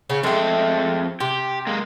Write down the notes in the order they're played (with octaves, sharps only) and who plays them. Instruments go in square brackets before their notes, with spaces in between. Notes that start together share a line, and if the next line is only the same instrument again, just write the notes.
[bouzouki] C#3 B3 C#4
[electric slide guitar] F2 A4 G5 [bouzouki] G#3 A3
[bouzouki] C3 [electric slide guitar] G4
[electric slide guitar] G#3 A#3